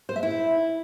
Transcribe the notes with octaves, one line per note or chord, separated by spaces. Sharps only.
C5
E5
E4